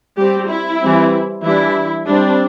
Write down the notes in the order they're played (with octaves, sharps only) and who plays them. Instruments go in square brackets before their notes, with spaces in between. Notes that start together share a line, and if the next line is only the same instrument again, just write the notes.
[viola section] G3 C4 G4
E4
E3 G3 C4
E3 G3 D4 E4
G3 C4 D4